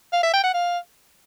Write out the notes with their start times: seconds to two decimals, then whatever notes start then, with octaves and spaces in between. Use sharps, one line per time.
0.13 F5
0.23 E5
0.33 G5
0.44 F#5
0.54 F5